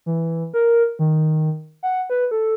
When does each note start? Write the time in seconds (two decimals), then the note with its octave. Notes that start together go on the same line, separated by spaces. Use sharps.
0.06 E3
0.54 A#4
0.99 D#3
1.83 F#5
2.10 B4
2.31 A4